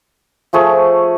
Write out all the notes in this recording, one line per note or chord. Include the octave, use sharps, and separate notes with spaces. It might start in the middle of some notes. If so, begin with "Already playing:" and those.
F3 A3 G#4 C#6